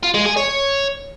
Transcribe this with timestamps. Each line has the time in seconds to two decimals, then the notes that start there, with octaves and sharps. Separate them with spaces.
0.03 F4
0.14 G#3
0.25 G#4
0.37 C#5